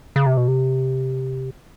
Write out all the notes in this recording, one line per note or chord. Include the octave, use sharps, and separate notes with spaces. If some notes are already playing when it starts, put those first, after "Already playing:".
C#3
C3
B2
C3